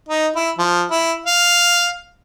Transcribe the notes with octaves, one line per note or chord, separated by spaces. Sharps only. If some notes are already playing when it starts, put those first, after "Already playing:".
D#4
E4
F3
E4
F5